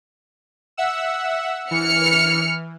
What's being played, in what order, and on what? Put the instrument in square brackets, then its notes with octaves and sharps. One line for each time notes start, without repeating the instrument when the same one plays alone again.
[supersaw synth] E5 F#5 E6
[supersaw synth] E3 [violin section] F6 C#7